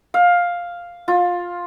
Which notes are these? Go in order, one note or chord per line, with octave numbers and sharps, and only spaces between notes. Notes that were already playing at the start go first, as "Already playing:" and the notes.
F5
F4